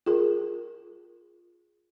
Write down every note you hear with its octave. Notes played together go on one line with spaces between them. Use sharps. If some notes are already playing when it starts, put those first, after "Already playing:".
F4 G#4 A#4